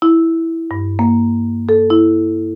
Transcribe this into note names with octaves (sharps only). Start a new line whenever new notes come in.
E4
G2
A#3
A4
E4